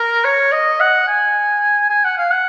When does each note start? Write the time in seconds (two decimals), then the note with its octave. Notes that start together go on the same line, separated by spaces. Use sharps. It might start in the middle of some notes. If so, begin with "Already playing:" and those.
Already playing: A#4
0.25 C#5
0.52 D#5
0.80 F#5
1.08 G#5
1.90 G#5
2.04 F#5
2.18 F5
2.31 F#5